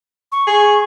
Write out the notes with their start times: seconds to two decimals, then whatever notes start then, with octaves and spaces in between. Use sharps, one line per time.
0.32 C#6
0.47 G#4